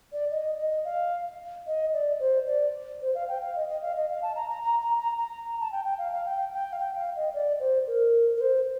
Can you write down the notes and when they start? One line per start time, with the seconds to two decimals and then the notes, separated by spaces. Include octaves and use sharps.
0.13 D5
0.31 D#5
0.59 D#5
0.85 F5
1.67 D#5
1.93 D5
2.20 C5
2.47 D5
3.02 C5
3.15 F5
3.28 G5
3.42 F5
3.56 D#5
3.68 D#5
3.83 F5
3.96 D#5
4.10 F5
4.22 A5
4.36 A#5
4.50 A#5
4.63 A#5
4.81 A#5
4.99 A#5
5.18 A#5
5.61 A5
5.72 G5
5.85 G5
5.98 F5
6.12 F5
6.26 G5
6.53 G5
6.73 F5
6.79 G5
6.97 F5
7.16 D#5
7.34 D5
7.60 C5
7.87 A#4
8.37 A#4
8.41 C5